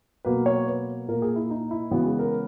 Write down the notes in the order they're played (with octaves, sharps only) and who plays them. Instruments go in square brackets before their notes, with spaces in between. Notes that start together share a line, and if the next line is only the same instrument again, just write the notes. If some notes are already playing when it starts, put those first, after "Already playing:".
[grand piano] B2 F#3 A#3 B4
C#5
B4
A#2 A#3 A#4
G#4
E4
D#4
E4
C#3 E3 G#3 B3 F#4
G#4
A#4